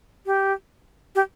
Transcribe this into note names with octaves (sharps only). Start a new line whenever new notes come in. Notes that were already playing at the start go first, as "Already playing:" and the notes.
G4
G4